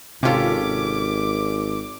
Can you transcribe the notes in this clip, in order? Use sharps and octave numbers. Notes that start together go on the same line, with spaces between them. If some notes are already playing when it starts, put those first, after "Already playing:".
G#1 C3 C#4 F4 G4 A4 D6